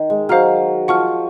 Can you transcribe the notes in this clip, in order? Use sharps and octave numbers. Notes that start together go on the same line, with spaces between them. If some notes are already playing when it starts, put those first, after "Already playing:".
Already playing: D#3
G#3
F#3 C5 F5 A#5 F6
F3 F#5 C#6 F6